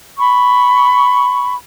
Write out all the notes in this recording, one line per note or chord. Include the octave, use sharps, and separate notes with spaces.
B5 C#6